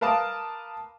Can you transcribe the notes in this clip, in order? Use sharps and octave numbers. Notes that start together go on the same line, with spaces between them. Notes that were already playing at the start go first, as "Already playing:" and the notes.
A#4 B4 F5 A5 D6 D#6